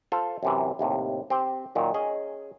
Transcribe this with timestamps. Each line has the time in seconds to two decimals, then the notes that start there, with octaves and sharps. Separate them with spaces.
0.12 F4 A4 C5
0.43 F#2 C3 E3
0.79 D#2 A2 C3
1.30 C4 G4 C5
1.75 A#2 D#3 F#3
1.94 C#4 G#4 D#5